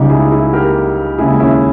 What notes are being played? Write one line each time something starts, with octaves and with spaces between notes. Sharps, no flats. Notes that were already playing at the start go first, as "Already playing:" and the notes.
Already playing: C#2 C#3 G3 D#4 G4
E4 G#4
E4 G#4
G4 A#4
D#2 C#3 G#3 E4 G#4
C#4 E4